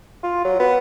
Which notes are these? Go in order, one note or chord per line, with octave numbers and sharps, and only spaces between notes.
F4
F#3
B3